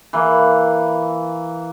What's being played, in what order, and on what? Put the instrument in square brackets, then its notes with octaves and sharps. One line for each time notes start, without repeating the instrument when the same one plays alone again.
[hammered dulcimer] E3 A#3